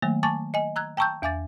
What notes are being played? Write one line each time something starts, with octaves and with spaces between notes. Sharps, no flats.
D#3 F#3 A3 A#3
G#5 A5 C#6 D6 A6
D#5 G#5
A#5 E6 F#6 G#6
G5 A5 A#5 C#6 E6 G6
E2 E5 G#5 D6 A6